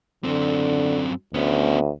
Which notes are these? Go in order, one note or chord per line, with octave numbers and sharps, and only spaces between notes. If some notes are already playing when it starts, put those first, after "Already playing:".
F#2 D3 C4
D2 B3 C#4